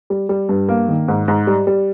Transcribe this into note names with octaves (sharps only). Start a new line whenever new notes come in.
G3
G3
G2
A#3
D#3
G#2
G#2
G3
G3